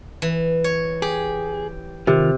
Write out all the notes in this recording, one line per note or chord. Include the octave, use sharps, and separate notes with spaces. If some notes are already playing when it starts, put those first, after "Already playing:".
E3
C#5
G4 G#4
C3 D#3 F4 A#4